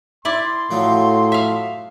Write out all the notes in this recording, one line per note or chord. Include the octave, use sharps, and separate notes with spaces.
E4 D5 C6
A2 F3 F#3
E5 F5